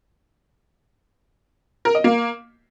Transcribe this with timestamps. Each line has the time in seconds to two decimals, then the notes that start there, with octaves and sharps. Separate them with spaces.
1.85 A#4
1.95 D#5
2.04 A#3